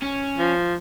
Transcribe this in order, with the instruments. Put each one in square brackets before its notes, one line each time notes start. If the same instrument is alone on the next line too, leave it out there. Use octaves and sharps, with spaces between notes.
[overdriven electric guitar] C#4
[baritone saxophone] F3